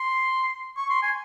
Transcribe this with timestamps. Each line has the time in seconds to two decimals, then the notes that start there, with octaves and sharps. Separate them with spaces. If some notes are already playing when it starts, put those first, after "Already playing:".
Already playing: C6
0.77 C#6
0.90 C6
1.02 G#5